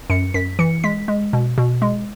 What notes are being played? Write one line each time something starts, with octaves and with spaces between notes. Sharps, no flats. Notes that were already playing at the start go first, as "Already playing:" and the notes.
F#2 C#7
F#2 B6
E3 C#7
G#3 B6
G#3
B2
B2
G#3